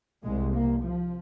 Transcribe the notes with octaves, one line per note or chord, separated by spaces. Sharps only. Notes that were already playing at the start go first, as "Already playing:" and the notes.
C2 C3 G#3
A#3
F3